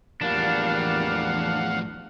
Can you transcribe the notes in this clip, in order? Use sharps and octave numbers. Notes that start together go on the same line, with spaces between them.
E2 A2 F3 G3 A#3 D4 F5 F#5